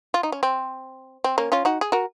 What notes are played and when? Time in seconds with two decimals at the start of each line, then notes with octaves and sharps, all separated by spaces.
0.14 F4
0.23 D#4
0.32 C#4
0.43 C4
1.24 C4
1.38 A#3 C#4
1.52 C#4 F4
1.65 D#4 F#4
1.81 G#4
1.92 F#4 A#4